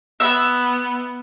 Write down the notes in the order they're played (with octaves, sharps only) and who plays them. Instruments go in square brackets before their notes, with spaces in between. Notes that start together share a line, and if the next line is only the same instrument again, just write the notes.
[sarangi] B3 [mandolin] E5 E6